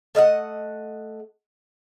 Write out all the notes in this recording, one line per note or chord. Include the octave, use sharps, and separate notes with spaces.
A3 D#5 F5 F#5